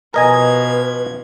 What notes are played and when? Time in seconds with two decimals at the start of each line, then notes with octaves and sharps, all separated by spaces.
0.14 B2 F3 A#4 B4 D#5 G#5 G#6